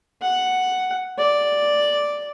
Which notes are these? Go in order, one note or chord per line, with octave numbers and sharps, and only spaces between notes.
F#5
D5